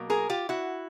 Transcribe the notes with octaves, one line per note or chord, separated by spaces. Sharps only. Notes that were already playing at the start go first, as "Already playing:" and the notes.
Already playing: B2 F#3 A#3
G#4 A#4
F4 G4
E4 F#4